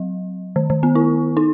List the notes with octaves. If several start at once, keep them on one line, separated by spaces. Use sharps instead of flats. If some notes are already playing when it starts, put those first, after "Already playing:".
Already playing: F#3
D#3
D#3
B3
E4
D#4